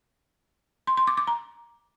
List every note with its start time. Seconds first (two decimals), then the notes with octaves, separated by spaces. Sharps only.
0.87 C6
0.97 C6
1.07 D6
1.17 D6
1.27 A#5